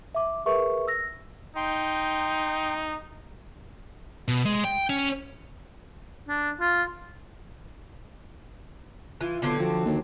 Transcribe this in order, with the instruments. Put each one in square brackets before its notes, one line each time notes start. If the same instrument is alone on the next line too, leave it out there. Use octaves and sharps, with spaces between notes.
[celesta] E5 D6
G#4 A#4 B4 E5 C#6
E6 A#6
[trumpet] D#4 [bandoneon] G5 C6
[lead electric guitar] B2
G#3
G5
C#4
[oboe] D4
F4
[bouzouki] E3 [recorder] F4
[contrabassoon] B2 [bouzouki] D3 F#3 C4
[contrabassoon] F3 [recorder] F#4
[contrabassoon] D#2